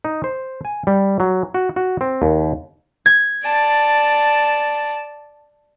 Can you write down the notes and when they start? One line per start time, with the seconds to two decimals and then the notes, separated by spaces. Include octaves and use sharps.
0.05 D#4
0.24 C5
0.65 G#5
0.87 G3
1.20 F#3
1.54 F#4
1.76 F#4
2.01 C4
2.22 D#2
3.06 G#6
3.44 D5 A5